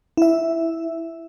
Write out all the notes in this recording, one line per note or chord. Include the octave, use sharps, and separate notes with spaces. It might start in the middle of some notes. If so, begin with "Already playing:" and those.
E4 E5